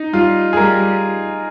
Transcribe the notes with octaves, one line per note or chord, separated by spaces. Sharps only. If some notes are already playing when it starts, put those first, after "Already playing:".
Already playing: D#4
G3 F4
G#4
G3 A#4